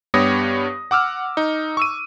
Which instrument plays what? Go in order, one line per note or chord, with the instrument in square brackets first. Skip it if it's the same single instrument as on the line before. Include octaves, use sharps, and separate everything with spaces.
[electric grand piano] G2 B3 G4 C#5 D#6 A#6
F#5 D6 E6 F6
D#4
C#6 E6 D#7